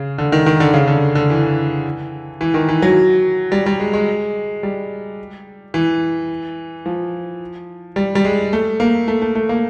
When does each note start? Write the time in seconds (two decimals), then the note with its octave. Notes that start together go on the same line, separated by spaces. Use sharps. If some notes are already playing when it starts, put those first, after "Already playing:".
Already playing: C#3
0.18 D3
0.32 D#3
0.46 D#3
0.60 D3
0.74 C#3
0.88 D3
1.15 D3
1.30 E3
2.41 E3
2.54 D#3
2.69 E3
2.82 F#3
3.52 G3
3.66 G3
3.80 G#3
3.93 G#3
4.63 G3
5.74 E3
6.86 F3
7.96 G3
8.15 G3
8.25 G#3
8.53 A3
8.80 A#3
9.08 A3
9.22 A3
9.35 A3
9.49 A#3